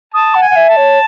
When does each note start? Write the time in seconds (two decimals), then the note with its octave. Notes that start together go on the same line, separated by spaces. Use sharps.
0.14 A5 D#6
0.35 F#5
0.42 G#5
0.50 F#5
0.56 E5
0.69 A5
0.76 C#5